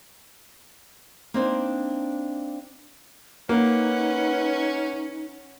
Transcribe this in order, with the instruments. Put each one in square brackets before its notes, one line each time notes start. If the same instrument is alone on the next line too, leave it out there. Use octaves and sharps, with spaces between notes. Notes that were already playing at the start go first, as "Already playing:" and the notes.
[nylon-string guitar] A#3 C4 D4 D#4
[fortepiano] A#3 [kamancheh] C#4 [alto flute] D#4 [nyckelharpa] B4 F#5